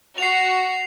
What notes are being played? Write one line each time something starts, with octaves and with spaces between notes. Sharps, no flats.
F#4 C7 F7